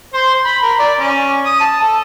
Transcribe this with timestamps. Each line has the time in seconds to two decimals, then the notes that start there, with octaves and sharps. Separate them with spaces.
0.14 C5
0.45 B5
0.62 A#4
0.79 D5
1.00 C#4
1.45 D#6
1.60 A5
1.82 A4